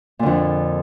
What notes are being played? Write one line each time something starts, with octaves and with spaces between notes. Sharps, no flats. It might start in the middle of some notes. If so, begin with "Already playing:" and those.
F2 A#2 D3